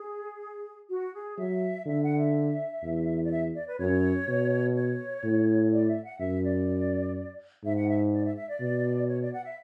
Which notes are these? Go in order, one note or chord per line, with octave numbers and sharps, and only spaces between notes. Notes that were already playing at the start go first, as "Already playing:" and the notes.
Already playing: G#4
F#4
G#4
F#3 E5
D3 E5
F#5
E5
E2
D5
E5
D5
B4
F#2 C#5
B2
C#5
A2
D5
E5
F#5
F#2 E5
D5
G#2 E5
F#5
E5
D5
E5
E5
D5
B2
C#5
D5
F#5
E5